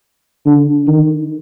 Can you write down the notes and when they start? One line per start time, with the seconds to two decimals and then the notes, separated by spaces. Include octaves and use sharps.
0.46 D3
0.87 D#3